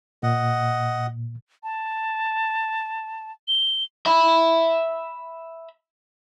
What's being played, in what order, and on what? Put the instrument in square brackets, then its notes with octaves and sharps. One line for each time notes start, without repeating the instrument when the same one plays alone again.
[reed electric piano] A#2 [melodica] D#5 F#5
[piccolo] A5
G7
[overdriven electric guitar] E5 B5